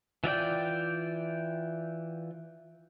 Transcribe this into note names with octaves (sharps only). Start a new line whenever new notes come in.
E3 F4 D5 G5